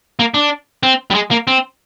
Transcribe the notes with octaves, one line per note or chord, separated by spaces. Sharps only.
A#3
D4
C4
G3
G#3
A#3
C4